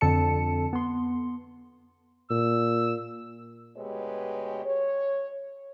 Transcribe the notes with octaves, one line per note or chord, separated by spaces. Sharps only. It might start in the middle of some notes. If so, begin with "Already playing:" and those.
F2 D3 A4 A5 C#7
B3 C6
A#2 E6
D2 B2 G#3 G4 B4 C#5
C#5